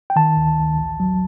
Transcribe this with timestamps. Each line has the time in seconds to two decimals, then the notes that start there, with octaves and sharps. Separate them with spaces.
0.10 G5
0.16 D#3 A5
0.37 D2
0.58 D2
0.78 A1
1.00 F#3